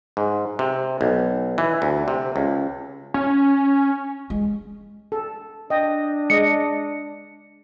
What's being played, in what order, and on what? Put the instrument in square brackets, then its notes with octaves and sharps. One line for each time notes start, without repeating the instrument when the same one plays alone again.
[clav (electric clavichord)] G#2
C3
B1
E3
D2
C3
C#2
[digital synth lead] C#4
[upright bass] G#3
[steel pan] A4
[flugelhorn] D4 [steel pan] D#5 G5
[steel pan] G#3 D#5 [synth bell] C#7